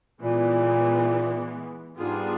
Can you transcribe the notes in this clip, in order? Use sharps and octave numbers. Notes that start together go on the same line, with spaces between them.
A#2 E3 G#3 B3
G#2 G3 B3 D4 F4 G#4